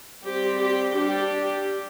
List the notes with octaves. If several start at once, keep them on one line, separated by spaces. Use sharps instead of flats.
G3 C4 G4
G4
G3 D4 G4